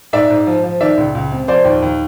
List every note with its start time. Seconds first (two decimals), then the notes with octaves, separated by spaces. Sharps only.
0.13 G#2 D5 E5
0.30 G#2
0.47 F3
0.64 F3
0.81 D#3 D5 E5
0.97 C#2
1.15 C#2
1.32 C3
1.48 F3 C5 D5
1.65 D#2
1.82 D#2